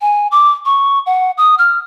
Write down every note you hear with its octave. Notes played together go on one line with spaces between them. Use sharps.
G#5
D6
C#6
F#5
D#6
F6